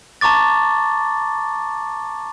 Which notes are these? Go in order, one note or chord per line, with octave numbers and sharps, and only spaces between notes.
A5 A#5 C#6 D6 A6